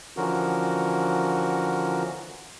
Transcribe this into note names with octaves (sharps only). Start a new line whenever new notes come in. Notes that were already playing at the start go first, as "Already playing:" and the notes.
D3 E3 F3 C#4 F#4 A#4